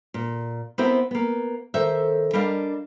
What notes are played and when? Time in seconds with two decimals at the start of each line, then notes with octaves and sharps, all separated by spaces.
0.14 A#2
0.78 B3 C4 E4 A#4 C5 E5
1.11 A#3 B3
1.74 D#3 A4 C5 E5
2.33 G3 D4 A#4 D#5 F5